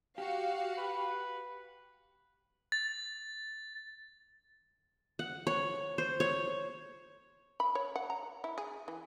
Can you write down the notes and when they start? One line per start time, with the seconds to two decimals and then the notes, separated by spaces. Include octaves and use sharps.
0.18 F#4 G4 F5
0.78 B4
2.72 A6
5.19 F#5
5.47 C#5
5.98 C5
6.20 C#5
7.60 B5
7.75 C#5
7.96 F#5
8.10 A#5
8.44 E4
8.58 G#4
8.88 E3